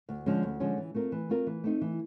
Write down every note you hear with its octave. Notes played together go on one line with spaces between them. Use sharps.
D2
D3 F3 G#3 C#4
D2
D3 F3 G#3 C#4
E3
A3 C4 F4 A#4
E3
A3 C4 F4 A#4
E3
A3 C4 D#4
E3